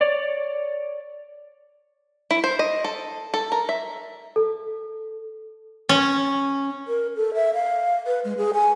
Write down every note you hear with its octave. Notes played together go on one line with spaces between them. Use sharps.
C#5 D5
E4
C5
D#5
A4
A4
A#4
E5
A4
C#4
A#4
A4
E5
F5
B4
G#3
G#4
G#5